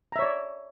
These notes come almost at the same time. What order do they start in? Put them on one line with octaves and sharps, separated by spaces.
A#5 E5 C#5 D5